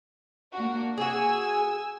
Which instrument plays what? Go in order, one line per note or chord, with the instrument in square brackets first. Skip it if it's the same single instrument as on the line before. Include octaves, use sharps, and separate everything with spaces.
[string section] A#3 D4 F#4
[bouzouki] F#4 G#4 [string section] G#5 E6